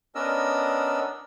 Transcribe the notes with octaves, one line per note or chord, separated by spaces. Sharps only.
B3 C#4 D4 A#4 D#5 E6